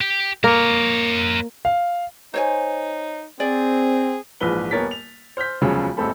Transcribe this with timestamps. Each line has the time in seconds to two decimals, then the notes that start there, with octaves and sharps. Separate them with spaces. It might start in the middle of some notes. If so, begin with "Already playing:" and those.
0.01 G4
0.44 A#3 A#4 C#5
1.65 F5
2.34 D#4 C5 C#5 G#5
3.40 C4 G#4 D5
4.41 A#1 G#2 E3 F3 B4 G7
4.71 D#1 B3 A#4 C#5 A6 B6
4.91 F7
5.37 C5 F6 G6 B6
5.61 E1 D2 C#3 F3 F#3
5.97 E1 A1 A3 C4 A4 B5